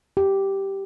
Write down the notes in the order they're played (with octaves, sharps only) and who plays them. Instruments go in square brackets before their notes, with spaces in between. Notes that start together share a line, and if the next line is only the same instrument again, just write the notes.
[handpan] G4